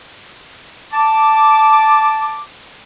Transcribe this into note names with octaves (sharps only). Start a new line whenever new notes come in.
A5 D6